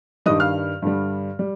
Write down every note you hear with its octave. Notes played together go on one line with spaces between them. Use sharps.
G2 D#3 G3 D#5 D#6
F5 F6
G2 D3 G3
G3